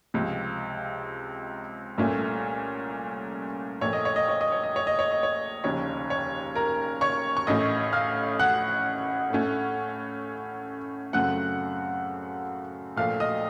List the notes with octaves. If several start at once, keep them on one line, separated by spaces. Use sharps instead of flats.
C#2 C3 F3
C2 A#2 A3 C#4
A#1 A#2 A3 C#5
D#5
C#5
D#5
C#5
D#5
C#5
D#5
C#5
D#5
C#5
D#5
C#5
F1 D#2 C#3 C#5
C#5
A#4 A#5
C#5 C#6
C#6
A1 A2 A3 C#4 D#5 D#6
F5 F6
F#5 F#6
A2 A3 C#4
F#2 C#3 A3 C4 F#5 F#6
A#1 A#2 A3 F5 F6
D#5 D#6